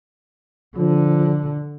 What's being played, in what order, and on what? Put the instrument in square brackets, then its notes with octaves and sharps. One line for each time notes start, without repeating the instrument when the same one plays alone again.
[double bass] D3 [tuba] F3